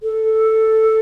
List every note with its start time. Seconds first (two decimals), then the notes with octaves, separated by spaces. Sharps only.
0.03 A4